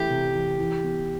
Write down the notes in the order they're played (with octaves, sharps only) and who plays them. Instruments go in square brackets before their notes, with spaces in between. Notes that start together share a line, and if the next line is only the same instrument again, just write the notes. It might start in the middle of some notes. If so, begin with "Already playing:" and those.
Already playing: [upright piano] E3 A3 E4 [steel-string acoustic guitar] G4
[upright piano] C3
E3
E3
B3